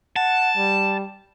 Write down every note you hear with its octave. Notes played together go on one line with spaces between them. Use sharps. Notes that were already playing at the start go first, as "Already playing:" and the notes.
F#5 A5
G3